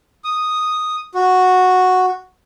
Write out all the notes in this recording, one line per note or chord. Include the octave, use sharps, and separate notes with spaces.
D#6
F#4